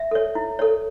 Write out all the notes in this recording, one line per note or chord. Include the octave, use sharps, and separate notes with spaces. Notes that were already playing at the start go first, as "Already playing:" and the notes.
Already playing: E5
A4 C#5
E4
A4 C#5